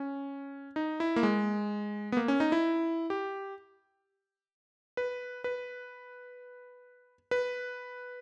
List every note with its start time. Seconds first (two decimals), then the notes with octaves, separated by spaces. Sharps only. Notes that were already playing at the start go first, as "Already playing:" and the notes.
Already playing: C#4
0.76 D#4
1.00 E4
1.16 A#3
1.23 G#3
2.12 B3
2.17 A#3
2.28 C#4
2.40 D#4
2.52 E4
3.10 G4
4.97 B4
5.44 B4
7.31 B4